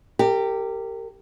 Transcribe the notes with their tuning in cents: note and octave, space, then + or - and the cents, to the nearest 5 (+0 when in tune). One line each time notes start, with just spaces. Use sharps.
G4 +0 A#4 -30